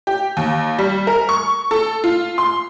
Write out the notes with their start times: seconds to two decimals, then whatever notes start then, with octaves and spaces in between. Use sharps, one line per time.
0.07 G4
0.37 D#2
0.79 G3
1.07 A#4
1.29 C#6
1.71 A4
2.04 F4
2.38 C6